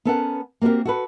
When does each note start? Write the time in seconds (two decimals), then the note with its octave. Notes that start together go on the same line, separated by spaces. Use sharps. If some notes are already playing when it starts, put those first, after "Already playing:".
0.05 B3 C#4 A4 A#4 C#5 F#5
0.62 A#3 C4 F#4 G4 A#4
0.85 F#4 A4 B4